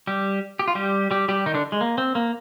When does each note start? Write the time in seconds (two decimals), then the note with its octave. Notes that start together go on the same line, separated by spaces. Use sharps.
0.07 G3 G4
0.59 G4
0.68 F4
0.75 G3 G4
1.11 G3 G4
1.28 G3 G4
1.46 D#3 D#4
1.54 D3 D4
1.72 G#3
1.81 A#3
1.98 C4
2.15 A#3